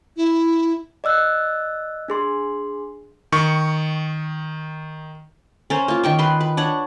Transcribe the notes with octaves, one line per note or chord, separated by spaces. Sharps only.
E4
D5 D#5 E6 F#6
D4 G#4 C6
D#3 C#6
C#4 A#4 C5
A#3 F4
D#3 G5 C#6
B4 C6
B4
D4 C#5 F#5